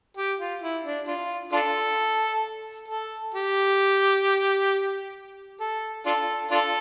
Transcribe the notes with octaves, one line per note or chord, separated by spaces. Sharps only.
G4
F4
E4
D4
D4 F4
D4 F4 A4
A4
G4
A4
D4 F4 A4
D4 F4 A4